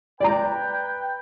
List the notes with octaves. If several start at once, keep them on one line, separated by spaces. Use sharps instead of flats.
B4 D5 G5 A#5